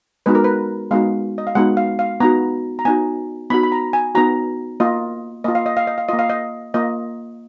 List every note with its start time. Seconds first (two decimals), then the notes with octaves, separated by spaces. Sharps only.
0.26 G#3 B3 D#4 F#4 B4
0.35 A#4
0.44 B4
0.91 G#3 B3 D#4 F#4 F5
1.38 D#5
1.47 F5
1.55 G#3 B3 D#4 F#4 F#5
1.77 F5
1.99 F5
2.20 B3 D#4 F#4 A#5
2.79 A#5
2.85 B3 D#4 F#4 G#5
3.50 B3 D#4 F#4 B5
3.63 B5
3.72 A#5
3.93 G#5
4.15 B3 D#4 F#4 A#5
4.80 A#3 F4 D#5
5.44 A#3 F4 D#5
5.55 F5
5.66 D#5
5.77 F5
5.87 D#5
5.98 F5
6.09 A#3 F4 D#5
6.19 F5
6.30 D#5
6.74 A#3 F4 D#5